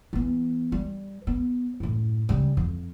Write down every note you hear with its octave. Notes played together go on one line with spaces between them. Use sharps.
E3 B3
G3
B3
F#2 A2
C#3 G3
F2